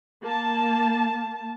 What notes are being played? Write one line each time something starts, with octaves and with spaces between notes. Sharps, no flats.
A#3 A5